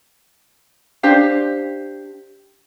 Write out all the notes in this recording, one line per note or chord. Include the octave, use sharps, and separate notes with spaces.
D4 G4 C5 F5